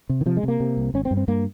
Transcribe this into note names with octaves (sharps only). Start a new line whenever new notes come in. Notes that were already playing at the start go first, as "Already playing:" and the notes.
C3
D#3
C3 F3
G#3
C3 A#3
C3
C2
G#1 C#4
C4
G2
C4
G2 A#3